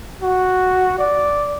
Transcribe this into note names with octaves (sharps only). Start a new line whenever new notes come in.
F#4
D5